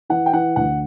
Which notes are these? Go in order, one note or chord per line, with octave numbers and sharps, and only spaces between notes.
E3 F#5
G5
E3 F#5
D2 F#5